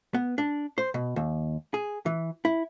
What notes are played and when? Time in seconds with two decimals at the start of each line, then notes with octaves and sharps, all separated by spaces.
0.14 B3
0.38 D4
0.78 C5
0.94 B2
1.16 D#2
1.74 G#4
2.06 E3
2.45 E4